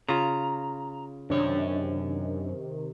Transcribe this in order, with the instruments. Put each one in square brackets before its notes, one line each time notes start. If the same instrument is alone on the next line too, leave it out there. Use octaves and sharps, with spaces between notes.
[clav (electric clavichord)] C#3 F4 [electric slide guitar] A#5
[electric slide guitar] F#2 C#5 [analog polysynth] C3 D#3 [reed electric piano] D4